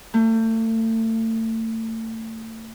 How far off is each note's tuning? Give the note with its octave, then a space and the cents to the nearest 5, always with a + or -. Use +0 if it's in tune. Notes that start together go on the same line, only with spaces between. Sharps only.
A3 +35